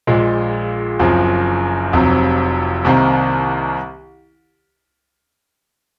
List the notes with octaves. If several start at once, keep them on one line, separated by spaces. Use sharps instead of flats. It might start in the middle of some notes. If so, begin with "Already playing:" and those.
A#1 A#2 G#3
F#1 F#2 F3 C4
F1 F2 C3 F#3
C2 C3 D#3 A#3